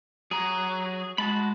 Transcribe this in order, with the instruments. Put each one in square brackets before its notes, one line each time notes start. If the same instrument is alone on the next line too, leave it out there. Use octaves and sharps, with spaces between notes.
[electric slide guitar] F#3 A#5 [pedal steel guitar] G#4
[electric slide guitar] G#3 [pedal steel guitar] F#4 A5 B5